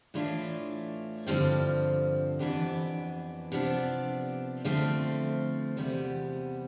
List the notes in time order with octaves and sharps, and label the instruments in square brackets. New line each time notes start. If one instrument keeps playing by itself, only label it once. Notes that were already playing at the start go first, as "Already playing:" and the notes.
[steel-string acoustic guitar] A2 E3 A3 D4 F4
G2 D3 F3 C4
F2 E3 B3 D4 G4
C3 F3 B3 D4
D3 F3 A3 C4
E2 C3 G3 B3